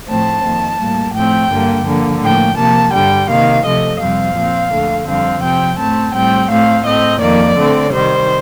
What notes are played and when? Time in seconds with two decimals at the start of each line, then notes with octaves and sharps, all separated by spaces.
0.08 A2 F3 A3 C4 A5
0.44 F2 D#3 A#3
0.80 A2 G3 A#3
1.14 A2 F3 A3 C4 G5
1.51 G2 D3 G3 A#3
1.86 D3 F3 A#3
2.21 A2 F3 A#3 G5
2.58 C3 F3 A#3 A5
2.93 G2 D3 G3 G5
3.29 C3 D#3 A#3 F5
3.65 C3 F3 A3 D#5
4.00 F2 C3 G3 C4 F5
4.36 A#2 F3 C4
4.71 F2 D3 A3
5.07 F2 D3 G3 C4 F5
5.43 C3 F3 C4 G5
5.79 A2 A3 C4 A5
6.14 A2 G3 C4 G5
6.50 A2 A3 C4 F5
6.85 A2 A3 C4 D#5
7.21 F2 D#3 A#3 D5
7.57 D3 A3 C4
7.93 C3 D#3 G3 C5